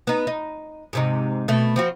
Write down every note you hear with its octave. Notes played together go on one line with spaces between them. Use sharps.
B3 D#4
D#4
G#2 C3 D#4
B2 A3
F3 C4 F#4